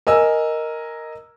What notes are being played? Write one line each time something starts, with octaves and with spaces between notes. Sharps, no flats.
A#4 D#5 G#5 E6